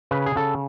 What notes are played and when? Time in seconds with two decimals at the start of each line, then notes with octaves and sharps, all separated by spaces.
0.11 C#3 B4
0.26 G#4
0.36 C#3 A4